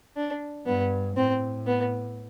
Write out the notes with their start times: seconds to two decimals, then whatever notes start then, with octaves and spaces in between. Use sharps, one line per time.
0.16 D4
0.66 G2 B3
1.16 A2 C4
1.66 B3